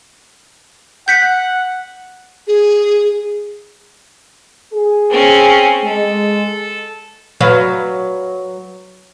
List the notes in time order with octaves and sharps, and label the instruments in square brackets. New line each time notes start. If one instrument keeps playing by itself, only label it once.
[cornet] F#5 [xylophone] G6 B6 C#7
[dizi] G#4
[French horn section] G#4
[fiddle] C4 C#4
[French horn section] G#3 [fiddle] A4
[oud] F#3 B4 F5